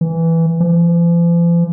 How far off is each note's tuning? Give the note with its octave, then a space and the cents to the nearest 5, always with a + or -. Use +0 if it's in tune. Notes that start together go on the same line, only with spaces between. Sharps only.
E3 +0
F3 -45